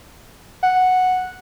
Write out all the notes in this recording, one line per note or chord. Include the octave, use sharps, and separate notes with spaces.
F#5